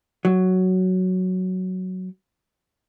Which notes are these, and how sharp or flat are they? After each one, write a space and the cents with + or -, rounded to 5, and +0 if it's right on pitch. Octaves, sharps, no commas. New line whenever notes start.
F#3 +5